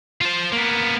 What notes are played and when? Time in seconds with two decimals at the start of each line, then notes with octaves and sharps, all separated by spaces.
0.21 F4 C5
0.53 A#3 B3